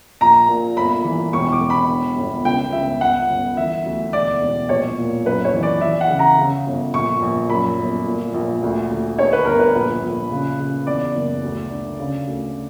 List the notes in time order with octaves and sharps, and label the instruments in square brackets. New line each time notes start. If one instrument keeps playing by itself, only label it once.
[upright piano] A#1 A#5
A#2
G1 B5
E3
E1 C#6
D6
E1
B5
D3
G1
C#2 G5
C#2 E5
G1 F#5
G1
E3 E5
D2
E1 D5
E1
A#1 C#5
A#2
F#2 B4
C#5
E3
D5
E3 E5
F#5
C#3
A#5
C#3
G1
A#1 C#6
A#1
F#2 B5
G1
A#2
A#1
D2
D2
D3 C#5
B4
G1 A#4
B4
A#1 B4
A#1
C#3
C#3
E2 D5
F#1
D2
D3
C#3
D2